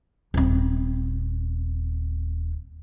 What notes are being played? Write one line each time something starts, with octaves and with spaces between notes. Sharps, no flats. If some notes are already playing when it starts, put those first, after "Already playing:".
D#1 C4